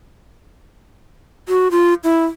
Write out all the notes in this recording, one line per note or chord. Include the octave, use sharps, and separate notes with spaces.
F#4
F4
E4